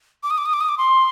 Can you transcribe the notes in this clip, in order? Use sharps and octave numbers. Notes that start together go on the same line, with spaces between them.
D6
D#6
D6
D#6
D6
D#6
D6
C6